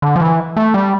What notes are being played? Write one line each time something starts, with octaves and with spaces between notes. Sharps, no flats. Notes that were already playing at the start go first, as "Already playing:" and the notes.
D3
F3
E3
A3
G3